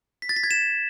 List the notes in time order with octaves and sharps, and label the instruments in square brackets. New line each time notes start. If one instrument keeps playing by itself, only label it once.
[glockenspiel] B6
A6
B6
G#6
E7